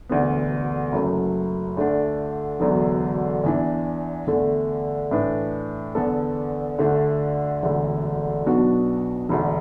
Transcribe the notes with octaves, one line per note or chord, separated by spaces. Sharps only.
E1 D2 D3 B3
F#1 F#2 F#3 A3
D2 D3 A3 D4
E1 D2 D3 F#3 B3
E2 E3 D4
E2 D3 A3
A2 E3 D4 B4
E2 D3 B3 D4 A4
D2 D3 A3 D4
E1 D2 D3 A3
B1 B2 B3 D4 F#4
E1 D2 D3